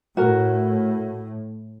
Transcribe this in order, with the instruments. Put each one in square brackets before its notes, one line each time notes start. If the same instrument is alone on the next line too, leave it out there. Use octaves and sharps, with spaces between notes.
[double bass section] A2 [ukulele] F#4 A#4